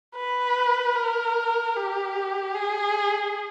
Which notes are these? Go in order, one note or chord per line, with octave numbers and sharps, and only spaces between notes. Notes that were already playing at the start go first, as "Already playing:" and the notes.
B4
A#4
G4
G#4